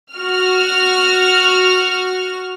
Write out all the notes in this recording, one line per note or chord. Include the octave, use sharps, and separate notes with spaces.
F#4 F6